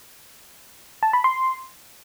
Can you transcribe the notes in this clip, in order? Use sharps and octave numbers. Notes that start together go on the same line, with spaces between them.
A5
B5
C6